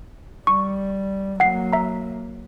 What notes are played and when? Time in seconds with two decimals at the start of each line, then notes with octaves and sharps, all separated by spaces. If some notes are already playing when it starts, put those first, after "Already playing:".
0.47 G3 C#6
1.40 F#3 A#3 F#5 C7
1.73 E5 A#5